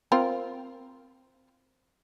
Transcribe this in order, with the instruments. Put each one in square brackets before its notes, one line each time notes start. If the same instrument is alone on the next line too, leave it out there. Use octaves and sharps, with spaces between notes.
[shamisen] C4 F4 A#4